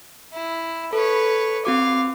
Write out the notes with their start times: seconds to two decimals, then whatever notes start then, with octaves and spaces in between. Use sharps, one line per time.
0.33 E4
0.93 A4 B4 C#5
1.65 C4 F#4 F5 D6